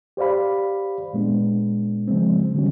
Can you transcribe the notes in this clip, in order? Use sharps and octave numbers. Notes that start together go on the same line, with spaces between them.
G4 C5 D5 F5 B5
A#2 G#3 B3 D4
C#3 F3 G#3 C4
D3 D#3 F#3 G3 C4 C#4